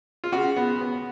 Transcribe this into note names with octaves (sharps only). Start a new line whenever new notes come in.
F4
C#3 F#4
B3
B3